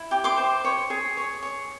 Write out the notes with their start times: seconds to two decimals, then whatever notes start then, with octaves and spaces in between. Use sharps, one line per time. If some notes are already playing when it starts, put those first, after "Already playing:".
Already playing: E4
0.11 G4
0.24 C6 D6
0.37 C5
0.64 C#5
0.90 G#4
1.17 C#5
1.42 C#5